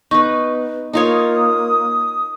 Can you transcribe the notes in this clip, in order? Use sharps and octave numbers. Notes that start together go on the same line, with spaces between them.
B3 D#4 B4 C#6
A#3 D#4 F4 C#5 D#6